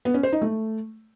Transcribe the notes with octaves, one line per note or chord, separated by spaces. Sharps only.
B3
C#4
C5
D#4
A3